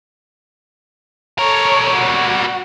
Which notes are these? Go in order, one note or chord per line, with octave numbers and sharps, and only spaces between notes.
G3 A4 A#4 C#5
F#4